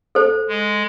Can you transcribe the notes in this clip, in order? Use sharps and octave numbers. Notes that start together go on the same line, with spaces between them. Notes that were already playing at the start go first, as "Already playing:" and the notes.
A4 C5
G#3